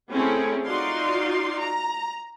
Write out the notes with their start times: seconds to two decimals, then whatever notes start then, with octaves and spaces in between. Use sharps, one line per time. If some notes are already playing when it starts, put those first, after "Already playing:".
0.11 A3 C4 C#4 E4 G#4 A4
0.65 D#4 F4 F#4 D5 F5 C6
1.58 A#5